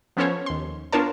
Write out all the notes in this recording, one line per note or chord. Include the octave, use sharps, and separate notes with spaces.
F3 B3 C#4 A4 C5 C#5
D#2 C6
B3 D4 F4 A#4 C#5 A5